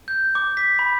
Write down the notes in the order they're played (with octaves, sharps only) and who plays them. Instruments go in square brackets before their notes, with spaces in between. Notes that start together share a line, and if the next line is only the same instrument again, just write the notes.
[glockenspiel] G6
D6
B6
B5